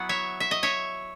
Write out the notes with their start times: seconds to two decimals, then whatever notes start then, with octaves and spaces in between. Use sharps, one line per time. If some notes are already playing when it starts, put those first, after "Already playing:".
Already playing: F#3 B3 E4 F#5
0.09 C#5 E5
0.40 E5
0.51 D#5
0.63 C#5 E5